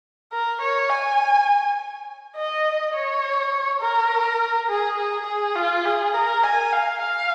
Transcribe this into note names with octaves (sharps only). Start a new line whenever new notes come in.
A#4
C#5
G#5
D#5
C#5
A#4
G#4
G#4
G#4
F4
G#4
A#4
G#5
F5
F5